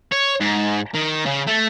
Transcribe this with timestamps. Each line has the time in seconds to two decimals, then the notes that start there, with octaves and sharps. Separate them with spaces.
0.12 C#5
0.41 G#2
0.94 D#3
1.25 C#3
1.47 A3